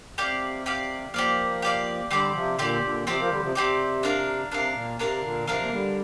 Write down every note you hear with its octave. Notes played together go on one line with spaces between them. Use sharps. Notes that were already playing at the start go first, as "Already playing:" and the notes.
C3 G4 D5 F5
G4 D5 F5
F3 A#3 G4 D5 F5
G4 D5 F5
D3 G3 C4 G4 D5
C3 F3
A#2 D3 C4 G4 D5
A#2 D3
C3 F3 C4 G4 D5
F3 A#3
D3 G3
C3 F3
C3 C4 G4 D5
D4 A#4 F5
C3 D4 A#4 F5
A#2
C3 D4 A#4 F5
A#2 D3
C3 F3 D4 A#4 F5
A#3
D3 G3